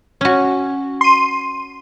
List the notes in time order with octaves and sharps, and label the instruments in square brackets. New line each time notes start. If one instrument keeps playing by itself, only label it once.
[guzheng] C#4 F#4
[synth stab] C6 D#7